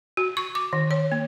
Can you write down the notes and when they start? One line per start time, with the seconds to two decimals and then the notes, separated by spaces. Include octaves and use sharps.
0.17 F#4
0.37 C#6
0.55 D6
0.73 D#3
0.91 C#5
1.12 A#3